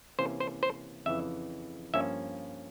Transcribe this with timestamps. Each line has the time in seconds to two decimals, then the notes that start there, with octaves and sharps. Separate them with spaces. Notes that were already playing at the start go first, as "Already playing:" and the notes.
0.19 C3 E3 A#3 C#4 C5
0.40 C5
0.63 C5
1.06 F2 C#3 E3 E5
1.94 G2 F3 A#3 C#4 E5